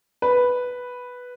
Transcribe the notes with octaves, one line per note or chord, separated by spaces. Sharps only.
B4